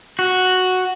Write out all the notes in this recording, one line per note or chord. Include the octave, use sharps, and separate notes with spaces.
F#4